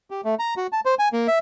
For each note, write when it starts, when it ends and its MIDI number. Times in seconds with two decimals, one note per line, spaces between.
0.11 0.21 67
0.25 0.35 57
0.39 0.54 82
0.57 0.67 66
0.72 0.80 81
0.86 0.95 72
0.99 1.09 80
1.13 1.27 58
1.28 1.39 76